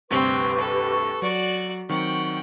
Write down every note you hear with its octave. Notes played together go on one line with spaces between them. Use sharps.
D2 G2 C3 C4 G4 B4 C#6
A4
F#3 F#4 D5
D#3 F#3 C4 F#5 G5 C#6